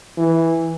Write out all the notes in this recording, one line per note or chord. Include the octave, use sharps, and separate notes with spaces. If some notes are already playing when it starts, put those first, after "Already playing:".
E3